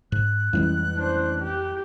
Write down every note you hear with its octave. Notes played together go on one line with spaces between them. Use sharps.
G#2 F#6
A1 F2 G3 G#3
D4 C5
G4